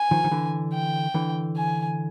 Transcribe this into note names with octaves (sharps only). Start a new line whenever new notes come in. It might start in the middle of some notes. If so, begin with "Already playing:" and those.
Already playing: G#5
D#3 F3
D#3
D3 E3
G5
D3 E3
G#5